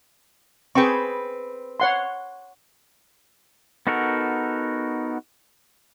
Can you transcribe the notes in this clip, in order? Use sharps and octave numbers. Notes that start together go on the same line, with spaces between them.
C4 G#4 B4 G5 C#6
C#5 F#5 C6
B3 D#4 F#4 A4 A#4